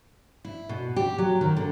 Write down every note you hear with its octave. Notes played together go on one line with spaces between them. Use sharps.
E4
B2
G4
F#3
D#3
D3